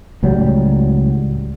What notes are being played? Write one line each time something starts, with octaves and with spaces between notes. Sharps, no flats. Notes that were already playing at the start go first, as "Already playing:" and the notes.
C#2 A2 F#3 G3